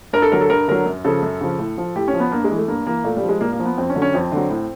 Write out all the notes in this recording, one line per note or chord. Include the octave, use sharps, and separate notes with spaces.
G2 A#4
A4
D3 F#3 A#4
A4
G2 A#4
D3 F#3 A#4
F#2
C#3 F3 A4
F#2
C#3 F3
A2
F3
A2 G4
C#4
F3
B3
G2 A#3
G#3
E3
A3
G2 A#3
E3 A#3
A#2 A3
G3
F3
G#3
A#2 A#3
A#3
F3
B3
F2 C4
C#4
D3 F#3
C#4
F2 C4
D3 F#3
A2